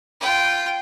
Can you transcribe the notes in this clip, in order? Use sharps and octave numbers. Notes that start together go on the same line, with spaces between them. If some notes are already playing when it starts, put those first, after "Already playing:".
F4 G5